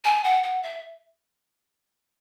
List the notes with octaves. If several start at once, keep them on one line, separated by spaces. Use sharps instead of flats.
G#5
F#5
F#5
E5